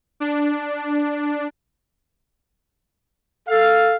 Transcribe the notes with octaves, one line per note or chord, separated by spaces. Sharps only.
D4
A4 F5